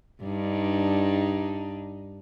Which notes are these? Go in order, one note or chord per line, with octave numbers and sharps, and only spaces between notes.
G2 D4 D#4